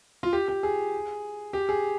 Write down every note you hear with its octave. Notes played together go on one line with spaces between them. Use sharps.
F4
G4
G4
G#4
G4
G#4